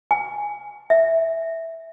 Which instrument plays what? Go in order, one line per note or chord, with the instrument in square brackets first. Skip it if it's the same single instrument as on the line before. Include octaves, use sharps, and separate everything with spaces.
[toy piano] G#5
E5